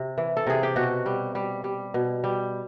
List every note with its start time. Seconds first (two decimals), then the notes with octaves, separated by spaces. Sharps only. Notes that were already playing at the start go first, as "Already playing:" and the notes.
Already playing: C3
0.18 E3
0.37 A4
0.47 C3 G#4
0.63 G4
0.76 B2 F#4
1.06 G3
1.35 G3
1.64 G3
1.94 B2
2.24 G3